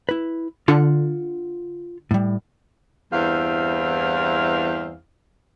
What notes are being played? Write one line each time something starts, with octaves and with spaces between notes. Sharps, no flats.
E4 B4
D3 F4 F#5
A2 G3
E2 G2 C4 E4 F5